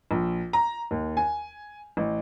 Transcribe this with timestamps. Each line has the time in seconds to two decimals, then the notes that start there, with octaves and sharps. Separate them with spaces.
0.11 A#1
0.53 A#5
0.91 D#2
1.17 G#5
1.97 A1